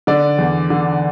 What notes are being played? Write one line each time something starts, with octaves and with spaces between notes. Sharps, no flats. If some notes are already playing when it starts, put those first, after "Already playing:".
D3 D5
E2
D3